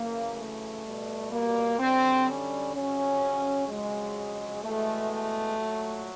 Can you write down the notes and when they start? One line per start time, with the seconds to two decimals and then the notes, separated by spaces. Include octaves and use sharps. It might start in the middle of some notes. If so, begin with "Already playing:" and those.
Already playing: F#2 C#3 E3 A#3
0.35 A3
0.84 B2 G3
1.30 A#3
1.79 F#2 D3 G3 C4
2.26 C#4
2.73 F2 C#3 F#3 C#4
3.68 F2 C#3 F#3 G#3
4.63 E2 B2 G#3 A3
5.11 A3
5.58 A#2 F#3